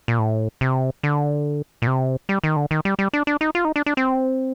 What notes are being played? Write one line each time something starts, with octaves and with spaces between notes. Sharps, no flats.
A#2
A2
C3
D3
A#2
C3
G3
D#3
D3
D#3
G3
G3
D4
D4
D#4
F4
D#4
D4
D4
C4